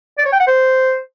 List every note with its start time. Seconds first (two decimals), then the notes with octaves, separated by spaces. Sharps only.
0.18 D5
0.25 C#5
0.33 G5
0.40 F#5
0.47 C5